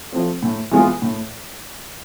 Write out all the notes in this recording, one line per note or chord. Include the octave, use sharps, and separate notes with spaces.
F3 A3 C4
A2
E3 G#3 B3 F4
A2